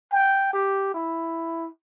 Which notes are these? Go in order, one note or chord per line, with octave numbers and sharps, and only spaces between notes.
G5
G4
E4